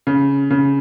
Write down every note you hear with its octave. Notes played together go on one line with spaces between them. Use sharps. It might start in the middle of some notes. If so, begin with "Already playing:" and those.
C#3
C#3